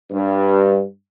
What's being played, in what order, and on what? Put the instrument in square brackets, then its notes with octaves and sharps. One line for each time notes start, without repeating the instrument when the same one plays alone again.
[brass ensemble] G2